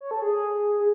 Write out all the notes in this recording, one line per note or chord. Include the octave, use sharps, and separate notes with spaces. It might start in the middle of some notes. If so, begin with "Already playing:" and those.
C#5
A4
G#4